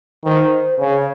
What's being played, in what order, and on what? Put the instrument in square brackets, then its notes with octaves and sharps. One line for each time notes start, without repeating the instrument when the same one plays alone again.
[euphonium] D#3 [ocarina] C5
[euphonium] C#3 [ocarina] C#5